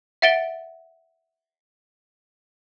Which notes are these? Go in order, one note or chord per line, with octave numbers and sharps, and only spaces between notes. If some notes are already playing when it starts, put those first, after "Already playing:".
E5 F#5 A6 D7 G7